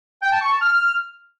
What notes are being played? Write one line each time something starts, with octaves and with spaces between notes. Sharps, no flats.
G5
A5
C#6
A5
F6